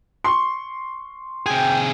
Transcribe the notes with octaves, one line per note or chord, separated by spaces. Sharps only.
C6 C#6
C3 G#4 G5